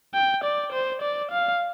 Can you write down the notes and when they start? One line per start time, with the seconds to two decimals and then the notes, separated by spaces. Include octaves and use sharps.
0.14 G5
0.44 D5
0.72 C5
1.02 D5
1.31 F5